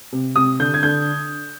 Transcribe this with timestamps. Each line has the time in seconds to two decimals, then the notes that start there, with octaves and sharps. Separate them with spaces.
0.12 C3
0.36 C3 D#6
0.60 D3 G6
0.74 G#6
0.83 D3 G6